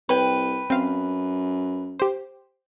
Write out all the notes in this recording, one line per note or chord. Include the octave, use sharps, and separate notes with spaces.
C2 B4 C#5 G5
F#2 C4 F5
G4 C5